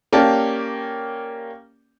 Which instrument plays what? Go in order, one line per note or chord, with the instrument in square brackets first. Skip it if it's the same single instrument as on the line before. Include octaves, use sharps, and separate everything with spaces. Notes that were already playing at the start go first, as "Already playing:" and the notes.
[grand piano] A#3 C#4 G4 D5 A5